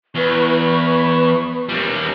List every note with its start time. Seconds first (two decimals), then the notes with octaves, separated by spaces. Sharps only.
0.15 E2 B4 C#6
1.69 D#2 G3